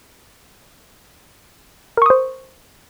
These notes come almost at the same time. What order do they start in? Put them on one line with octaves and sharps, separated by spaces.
A#4 C#6 D#6 C5